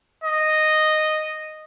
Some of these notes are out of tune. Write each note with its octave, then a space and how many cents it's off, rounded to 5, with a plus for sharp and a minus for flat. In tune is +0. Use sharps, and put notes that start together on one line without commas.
D#5 -5